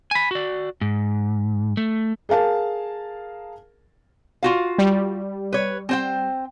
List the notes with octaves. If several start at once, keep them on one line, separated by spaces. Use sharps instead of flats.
G#5 B5
F#4 D5
G#2
A3
G#4 A#4 F5 A5
F4 F#4 F5
G3
B4 C#5
C4 C5 G5